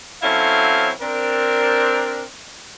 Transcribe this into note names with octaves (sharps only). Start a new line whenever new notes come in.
F#3 C4 C#4 E4 A4 F5
C4 D4 A#4